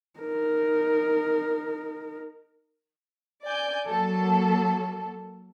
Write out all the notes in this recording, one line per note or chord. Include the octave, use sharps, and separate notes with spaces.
D#4 A#4
D5 G#5 G6
F#3 A#3 A4